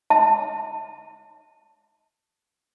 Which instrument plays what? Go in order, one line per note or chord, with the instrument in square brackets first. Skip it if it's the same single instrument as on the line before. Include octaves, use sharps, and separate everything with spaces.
[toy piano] A5